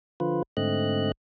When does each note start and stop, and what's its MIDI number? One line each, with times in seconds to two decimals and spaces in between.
0.20 0.43 50
0.20 0.43 53
0.20 0.43 65
0.20 0.43 71
0.57 1.12 44
0.57 1.12 50
0.57 1.12 57
0.57 1.12 60
0.57 1.12 75
0.57 1.12 90